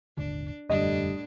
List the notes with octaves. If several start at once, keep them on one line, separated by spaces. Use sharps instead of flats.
D#1 G#1 D3 D4
E1 F#2 A2 D3 G3 D4 D#5